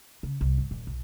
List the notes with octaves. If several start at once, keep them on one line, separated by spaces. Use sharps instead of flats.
C#3
C2
G1
D#1
B1